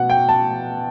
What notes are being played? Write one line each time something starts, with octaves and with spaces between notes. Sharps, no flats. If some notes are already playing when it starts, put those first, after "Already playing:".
Already playing: B2 F#5
G5
A5